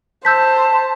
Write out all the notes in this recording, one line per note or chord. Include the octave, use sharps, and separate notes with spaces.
C5 A5 E6 G6 B6